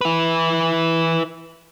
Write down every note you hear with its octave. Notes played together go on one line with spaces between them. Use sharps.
E4 B4